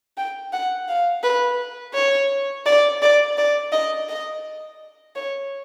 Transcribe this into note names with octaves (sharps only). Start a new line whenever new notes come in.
G5
F#5
F5
B4
C#5
D5
D5
D5
D#5
D#5
C#5